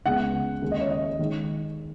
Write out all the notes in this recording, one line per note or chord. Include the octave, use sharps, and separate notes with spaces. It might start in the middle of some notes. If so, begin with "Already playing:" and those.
C#2 C#3 G#3 B3 F#5
D#2 C#3 G#3
D#5
C#5
D#5
D#3 G#3